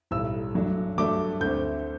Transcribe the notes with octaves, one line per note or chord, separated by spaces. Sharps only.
B1 A2 G3 E6
F#2 F#3 A3 D4
G2 F#3 A3 D4 D6
D2 D3 A3 C4 G6